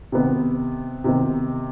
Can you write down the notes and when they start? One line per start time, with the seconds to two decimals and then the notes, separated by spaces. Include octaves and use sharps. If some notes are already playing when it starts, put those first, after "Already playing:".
0.12 C3 D#3 B3
1.04 C3 D#3 B3